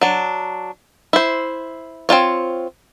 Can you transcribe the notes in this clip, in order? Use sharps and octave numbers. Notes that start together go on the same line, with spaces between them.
F#3 D4
E4 C5
C4 D#4 F4 C#5